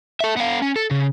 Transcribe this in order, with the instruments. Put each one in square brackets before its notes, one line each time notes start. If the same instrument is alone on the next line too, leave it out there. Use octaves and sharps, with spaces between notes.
[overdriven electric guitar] A4 E5
B3 F5
C#4
A4
C#3